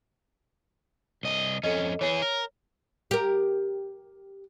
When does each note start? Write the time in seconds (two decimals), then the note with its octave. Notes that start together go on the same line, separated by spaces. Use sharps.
1.23 C2 D#5
1.63 F2 C#4 A4 D#5
2.01 E3 G#4 C#5
2.22 A#4
3.11 G4 A#4